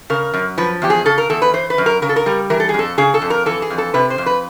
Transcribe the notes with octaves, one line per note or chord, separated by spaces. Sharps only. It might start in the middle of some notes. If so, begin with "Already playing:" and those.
C#3 A#4
F#2
F3 B4
E2 G4
G#4
C#3 A4
A#4
E2 A4
B4
E3 C5
B4
F#2
A#4
C#3 A#4
A4
A#4
G3
E3 A#4
A4
G#4
F2 A4
C#3 G#4
A4
F2
A#4
E3 A4
G#4
F2
A4
C3 B4
C5
F2
B4